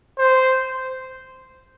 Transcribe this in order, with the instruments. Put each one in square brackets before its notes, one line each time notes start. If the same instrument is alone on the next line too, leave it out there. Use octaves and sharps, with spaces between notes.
[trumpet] C5